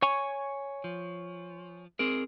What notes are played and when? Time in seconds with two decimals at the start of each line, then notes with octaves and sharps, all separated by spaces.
0.02 C#5 G#5 C#6
0.84 F3
1.99 C4 G#4 A#4